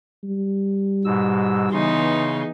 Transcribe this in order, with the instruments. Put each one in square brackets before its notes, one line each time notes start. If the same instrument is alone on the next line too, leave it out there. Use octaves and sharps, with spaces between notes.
[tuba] G3
[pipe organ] G#2 B2 E6
[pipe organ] C#3 C6 [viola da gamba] E3 B3 D#4